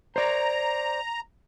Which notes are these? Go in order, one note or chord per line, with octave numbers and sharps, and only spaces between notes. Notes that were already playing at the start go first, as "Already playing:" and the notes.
C5 D5 A#5